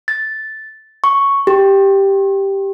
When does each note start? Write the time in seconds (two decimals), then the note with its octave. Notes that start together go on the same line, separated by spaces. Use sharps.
0.08 A6
1.04 C#6
1.47 G4